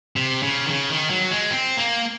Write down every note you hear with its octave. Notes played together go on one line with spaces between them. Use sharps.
C3
C#3
D#3
C#3
D#3
F#3
G#3
C4
A#3